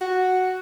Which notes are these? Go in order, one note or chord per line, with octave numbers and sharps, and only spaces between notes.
F#4